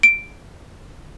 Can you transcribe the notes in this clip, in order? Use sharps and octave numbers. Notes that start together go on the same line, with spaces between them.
D7